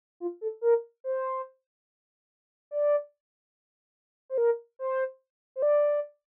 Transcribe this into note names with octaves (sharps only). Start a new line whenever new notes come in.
F4
A4
A#4
C5
D5
C5
A#4
C5
C5
D5